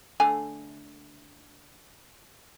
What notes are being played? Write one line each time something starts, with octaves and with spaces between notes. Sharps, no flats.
D3 A3 G#5